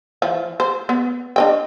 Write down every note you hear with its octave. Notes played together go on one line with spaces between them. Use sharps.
E3 F3
C5
B3
D4 D#5 G5